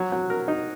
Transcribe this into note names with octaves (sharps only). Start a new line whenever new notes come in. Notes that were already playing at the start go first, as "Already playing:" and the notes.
Already playing: F#3
F#3
A#4
D#4